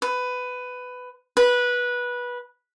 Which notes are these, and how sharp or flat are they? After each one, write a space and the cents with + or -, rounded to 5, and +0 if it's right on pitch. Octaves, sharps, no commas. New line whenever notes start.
B4 +15
B4 -15